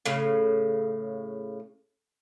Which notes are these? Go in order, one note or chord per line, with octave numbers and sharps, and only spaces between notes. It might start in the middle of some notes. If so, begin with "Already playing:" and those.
A2 C#3